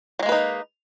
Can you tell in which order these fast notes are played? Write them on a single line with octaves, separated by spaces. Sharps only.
F#3 G#3 A#3 B4 D#4